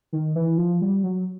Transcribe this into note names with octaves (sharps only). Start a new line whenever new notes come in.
D#3
E3
F3
G3
F#3